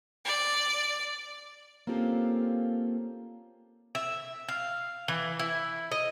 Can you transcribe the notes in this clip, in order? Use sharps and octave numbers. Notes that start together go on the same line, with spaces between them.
D5
A#3 C4 C#4 F4 G4 A4
E5
F5
E3
E4
D#5